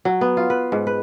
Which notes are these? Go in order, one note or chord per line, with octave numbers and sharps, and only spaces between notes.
F#3
B3
F4
B4
G#2
B4